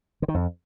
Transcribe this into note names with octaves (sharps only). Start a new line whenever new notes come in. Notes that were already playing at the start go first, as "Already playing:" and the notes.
D3
D#3
F2